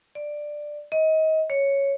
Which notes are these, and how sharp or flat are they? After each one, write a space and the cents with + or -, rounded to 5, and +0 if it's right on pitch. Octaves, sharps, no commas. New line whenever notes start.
D5 +10
D#5 +25
C#5 +0